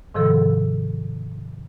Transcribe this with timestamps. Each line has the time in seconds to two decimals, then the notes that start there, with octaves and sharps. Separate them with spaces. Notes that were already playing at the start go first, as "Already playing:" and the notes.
0.14 G#2 C3 D#3 F3 A4 E6